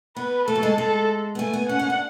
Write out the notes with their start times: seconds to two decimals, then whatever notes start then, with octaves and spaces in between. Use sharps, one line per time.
0.16 B3 B4
0.48 A3 A4
0.55 F#3
0.63 G#3
0.78 G#3 A4
1.35 B3
1.39 A3 G#5
1.53 B3
1.69 C#4 F#5
1.79 C#4
1.90 D4